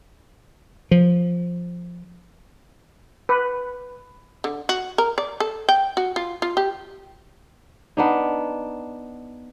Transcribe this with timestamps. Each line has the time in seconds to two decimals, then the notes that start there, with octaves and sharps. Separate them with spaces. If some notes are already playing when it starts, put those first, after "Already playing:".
0.91 F3
3.29 B4
4.44 D3
4.69 F#4
4.98 A#4
5.18 D5
5.40 A4
5.69 G5
5.97 F#4
6.16 F4
6.42 F4
6.57 G4
7.97 B3 D4 D#4